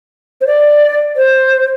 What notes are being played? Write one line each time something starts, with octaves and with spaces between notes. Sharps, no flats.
C5
D5
C5